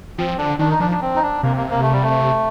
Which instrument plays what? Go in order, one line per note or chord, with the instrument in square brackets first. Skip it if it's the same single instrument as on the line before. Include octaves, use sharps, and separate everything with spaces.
[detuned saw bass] F3 [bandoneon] C4
[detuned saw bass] D3 [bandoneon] D4
[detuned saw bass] D#3 [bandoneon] D4
[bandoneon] D#4
[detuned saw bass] F3 [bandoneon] D4
[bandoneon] D4
C4
D#4
D4
[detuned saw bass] C3 [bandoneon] A#3
[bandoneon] A#3
A#3
A3
G3
A3